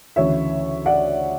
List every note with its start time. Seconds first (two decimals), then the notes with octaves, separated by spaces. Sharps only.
0.16 D2 C#3 E3 C#5 E5
0.86 D5 F#5